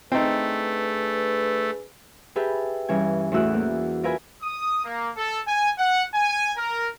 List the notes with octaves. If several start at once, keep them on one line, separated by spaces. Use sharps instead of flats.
A3 C4 D4 D#4 G#4 B4
G4 G#4 B4 E5 A5
G2 E3 C#4 G#5
E2 A2 E3 F#4 E6 F#6
A#3
F4 A#4 B4 E5 G#5 B5
D#6
A#3
A4
G#5
F#5
G#5
A#4